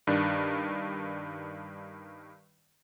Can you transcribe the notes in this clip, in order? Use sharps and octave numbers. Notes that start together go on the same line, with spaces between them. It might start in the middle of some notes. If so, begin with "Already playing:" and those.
G2 D#3 D4